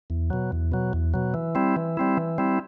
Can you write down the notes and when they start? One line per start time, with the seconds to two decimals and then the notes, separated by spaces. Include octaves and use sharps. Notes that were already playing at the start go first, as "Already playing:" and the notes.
0.10 E2
0.30 B2 F#3
0.52 E2
0.72 B2 F#3
0.93 E2
1.14 B2 F#3
1.34 E3
1.55 G3 C4 E4
1.76 E3
1.97 G3 C4 E4
2.17 E3
2.38 G3 C4 E4